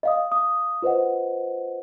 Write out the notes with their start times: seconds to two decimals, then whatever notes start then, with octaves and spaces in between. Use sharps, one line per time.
0.03 D#5 F5 D#6
0.31 F5 D#6
0.82 F4 B4 C5 D#5 F#5